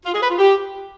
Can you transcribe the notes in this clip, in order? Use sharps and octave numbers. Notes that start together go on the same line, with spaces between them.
F4
G#4
B4
F4
G4